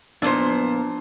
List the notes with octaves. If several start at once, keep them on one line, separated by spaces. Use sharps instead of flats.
F2 A#2 B3 D4 C5